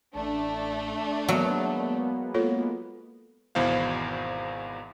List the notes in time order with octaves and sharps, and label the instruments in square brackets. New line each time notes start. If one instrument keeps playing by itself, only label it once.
[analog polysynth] A1 [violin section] A3 D4
[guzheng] F#3 [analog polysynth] G#3 A#3 B3
[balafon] F4 A4 C#5
[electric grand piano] G#1 E2 B2 E4 C5 F5